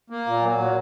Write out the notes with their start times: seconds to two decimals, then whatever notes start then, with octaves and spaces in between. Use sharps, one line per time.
0.10 A#3
0.26 A#2
0.42 F#3
0.58 A#2